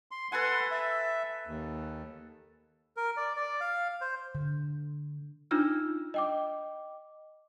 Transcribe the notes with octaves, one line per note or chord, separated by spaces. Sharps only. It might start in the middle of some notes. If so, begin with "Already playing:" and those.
C6
A4 B4 F#5 G#5 C6
E5
D#2
A#4
D5
D5
F5
C5
D3
D4 D#4 F4 E6 F6
D#5 G5 D6